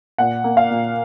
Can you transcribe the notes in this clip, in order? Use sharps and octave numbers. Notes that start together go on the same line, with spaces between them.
A#2 F#5
A#3
F5
A#2